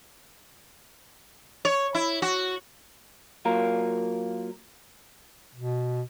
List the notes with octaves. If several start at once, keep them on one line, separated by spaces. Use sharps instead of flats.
C#5
E4
F#4
F#3 A#3 F4 A#4
B2